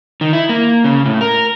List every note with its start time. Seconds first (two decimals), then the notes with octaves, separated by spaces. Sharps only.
0.21 D#3
0.33 E4
0.49 A#3
0.84 C#3
1.06 A2
1.21 A#4